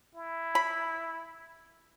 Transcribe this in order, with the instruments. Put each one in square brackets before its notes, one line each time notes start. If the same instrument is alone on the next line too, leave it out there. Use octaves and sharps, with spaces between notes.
[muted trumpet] E4
[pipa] B5